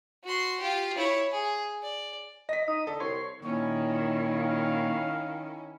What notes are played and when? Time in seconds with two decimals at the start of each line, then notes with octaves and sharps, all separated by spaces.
0.24 F#4 C6
0.60 F4 G4
0.97 E4 C#5
1.31 G#4
1.83 D5
2.49 D#5 A#6 B6
2.68 D#4 D#6
2.87 D3 A4
3.00 C2 C#5 C6
3.44 A#2 D#3 C#4 E4 C#5
4.34 F5